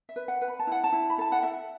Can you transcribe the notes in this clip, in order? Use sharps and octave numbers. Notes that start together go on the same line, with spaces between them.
E5
B4
F#5
B4
B5
A5
E4 F#5
A5
E4
B5
A4 A5
F#5
A4 E5